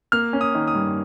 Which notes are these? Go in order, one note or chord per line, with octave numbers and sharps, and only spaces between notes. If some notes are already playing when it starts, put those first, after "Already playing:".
A#3 F6
C#4
D#6
D#3
D#6
G2